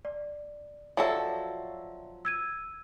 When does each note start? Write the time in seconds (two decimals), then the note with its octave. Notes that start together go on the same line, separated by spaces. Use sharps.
0.05 D5
0.97 F3 F#3 A4 D5 E5
2.25 E6 G#6 D#7